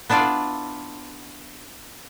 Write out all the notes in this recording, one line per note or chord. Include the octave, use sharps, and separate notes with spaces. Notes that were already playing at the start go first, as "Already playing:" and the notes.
B3 D4 E4 F4 D5